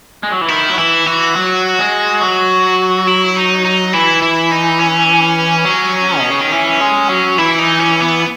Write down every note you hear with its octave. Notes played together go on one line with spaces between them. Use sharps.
G#3
F#3
E3
D#3 E4
F#3
E3 E4
E3 F#4
F#3
G#3
F#3
E4
D#4
D#4
E3 E4
E4
D#4
C#4
F#3
B2
C#3
D#3
E3
G#3
F#3
E3 E4
D#4
C#4
B3